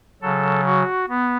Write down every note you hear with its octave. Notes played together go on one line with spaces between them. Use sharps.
C#3 F#3 A4
F#4
B3